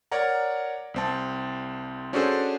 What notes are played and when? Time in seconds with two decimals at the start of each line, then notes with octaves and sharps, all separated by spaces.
0.12 A#4 C#5 D5 F#5 A#5
0.94 C2 C4 A5
2.13 C#4 D4 F#4 G#4 A4 C5